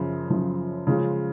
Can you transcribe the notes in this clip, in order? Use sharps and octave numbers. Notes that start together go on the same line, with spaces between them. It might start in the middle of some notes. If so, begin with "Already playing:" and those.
Already playing: F#2 C#3 F3
F#2 C#3 F3
C#3 F3 G#3 C#4 F4